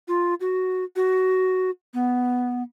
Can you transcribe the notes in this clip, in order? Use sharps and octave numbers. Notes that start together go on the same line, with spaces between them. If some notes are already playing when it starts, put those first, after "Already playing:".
F4
F#4
F#4
B3